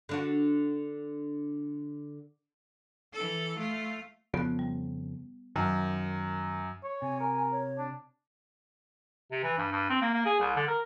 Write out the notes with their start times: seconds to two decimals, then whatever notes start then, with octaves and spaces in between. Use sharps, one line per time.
0.09 D3 D4 F#4
3.13 E3 A4
3.57 A3 F4
4.34 F2 C#3 F3 B3 F#6
4.59 G3
5.56 F#2 D#3
6.84 C#5
7.02 C3 G#5
7.20 A#4
7.52 C#5
7.78 D4
9.32 C3
9.43 E3
9.58 G2
9.72 G2
9.90 C4
10.01 A#3
10.14 A#3
10.26 G#4
10.40 C2
10.56 D3
10.68 A#4